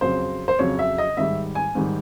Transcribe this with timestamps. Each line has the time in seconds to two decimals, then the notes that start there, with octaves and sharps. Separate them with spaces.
0.01 F2 C#3 F#3 C5
0.48 C5
0.59 F2 C#3 F#3 C#5
0.79 E5
0.98 D#5
1.17 G#2 D#3 G3 E5
1.55 G#5
1.75 G#2 D#3 G3